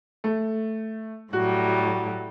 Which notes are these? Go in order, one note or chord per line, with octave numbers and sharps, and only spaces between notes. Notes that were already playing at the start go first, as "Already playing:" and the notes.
A3
A2 F#3 G3 F#4